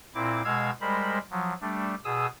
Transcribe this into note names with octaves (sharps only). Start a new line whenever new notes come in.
A#2 C4 E4 D6
B2 G#3 F5 E6 G#6
G3 G#3 A#4 C5 B5
F3 F#3
G3 A3 D4
B2 G#4 D#6 E6